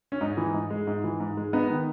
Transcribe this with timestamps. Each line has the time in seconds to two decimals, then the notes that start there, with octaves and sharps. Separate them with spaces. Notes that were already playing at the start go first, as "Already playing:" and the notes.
0.12 C#4
0.21 G#2 D#4
0.37 E3
0.54 G#2
0.70 G#3
0.87 G#2
1.04 E3
1.20 G#2
1.37 G#3
1.53 B3 D#4
1.70 D#3